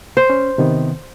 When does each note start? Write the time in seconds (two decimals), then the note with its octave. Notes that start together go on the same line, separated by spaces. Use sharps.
0.17 C5
0.30 C#4
0.58 C3 D#3 B3